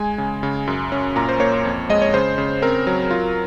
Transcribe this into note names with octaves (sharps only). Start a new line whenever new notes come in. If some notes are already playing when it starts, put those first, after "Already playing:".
Already playing: G#3 G#5
C#3
C#3
F#2
C#4
A#2 A#5
C5
A#3 C#5
F2
G#3 D#5
C#5
C#3 C5
C#3
C4 A#4
F#3
F4